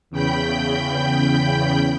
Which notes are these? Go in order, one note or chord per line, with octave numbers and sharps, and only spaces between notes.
E2 C#3 G5 B5 G6